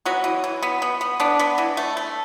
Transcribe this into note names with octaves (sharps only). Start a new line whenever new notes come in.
F#3 B3 F#4
E3
E3
B3
B3
B3
B3 D4
B3
E3
A3
A3